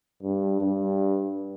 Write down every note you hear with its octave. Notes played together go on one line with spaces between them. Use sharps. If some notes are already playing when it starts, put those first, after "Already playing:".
G2
G2